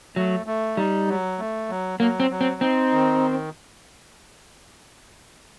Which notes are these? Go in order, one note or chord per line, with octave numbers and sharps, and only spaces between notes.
F#3 A3
A3
G3 D#4
F#3
A3
F#3
F#3 A#3
C4
F#3
C4
C4 D#4
D#3